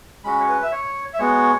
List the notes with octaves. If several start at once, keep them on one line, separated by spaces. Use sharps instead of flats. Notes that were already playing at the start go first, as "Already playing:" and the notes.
G#3 C#4 F#4 B5
C#5
B4
E5
C#5
E5
G#3 B3 F#4 C#5